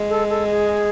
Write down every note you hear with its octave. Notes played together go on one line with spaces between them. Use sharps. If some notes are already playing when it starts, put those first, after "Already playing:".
Already playing: G#3
A4
A4
G#4